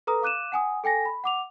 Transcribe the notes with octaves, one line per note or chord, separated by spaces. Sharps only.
A4 B4 A#5 D#6
F5 D6 F#6 D#7 E7
F#5 G#5 D#6
A4 G5 G#5 A#6
B5
F#5 D6 F7